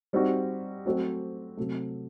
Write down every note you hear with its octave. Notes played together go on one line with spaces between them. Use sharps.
G3 C4 D#4 F#4
F#3 A3 C4 F#4 C5
C3 F#3 A3